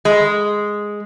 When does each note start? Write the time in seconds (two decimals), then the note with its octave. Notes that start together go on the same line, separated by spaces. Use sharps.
0.05 G#3